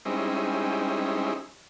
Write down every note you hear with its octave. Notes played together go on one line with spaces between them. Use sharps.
G3 G#3 C4 C#4 D#4 E4